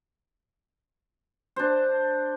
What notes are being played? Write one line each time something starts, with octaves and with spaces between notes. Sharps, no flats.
D4 C5